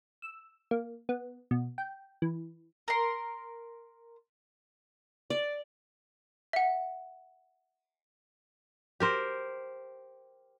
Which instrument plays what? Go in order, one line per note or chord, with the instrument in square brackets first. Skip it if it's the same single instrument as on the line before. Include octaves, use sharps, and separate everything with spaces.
[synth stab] E6
A#3
B3
B2
G5
E3
[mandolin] A#4 C6
[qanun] D5
[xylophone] E5 F#5
[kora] G4 A#4 C5